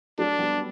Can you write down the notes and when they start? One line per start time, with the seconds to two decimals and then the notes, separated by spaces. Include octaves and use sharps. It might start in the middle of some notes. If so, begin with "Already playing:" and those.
0.18 F#3 A3 D4
0.39 G3 B3